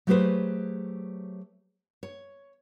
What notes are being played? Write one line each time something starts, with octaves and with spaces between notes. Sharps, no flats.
F#3 A3 G4 G#4 B4 C5
C#5